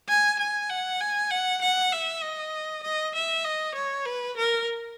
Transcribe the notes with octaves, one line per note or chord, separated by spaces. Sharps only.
G#5
G#5
F#5
G#5
F#5
F#5
E5
D#5
D#5
E5
D#5
C#5
B4
A#4